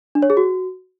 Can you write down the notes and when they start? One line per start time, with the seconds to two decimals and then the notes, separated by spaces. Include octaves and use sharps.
0.15 D4
0.23 C#5
0.30 G#4
0.37 F#4